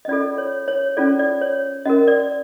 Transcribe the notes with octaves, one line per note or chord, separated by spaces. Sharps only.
D#5
C#4 F4 A4 D5
C#5
C#5
C#4 F4 A4 D5
D5
C#5
C#4 F#4 A#4 D#5
D5